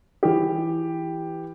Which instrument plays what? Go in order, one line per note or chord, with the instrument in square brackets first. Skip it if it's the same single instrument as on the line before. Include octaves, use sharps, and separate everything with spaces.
[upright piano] E3 G4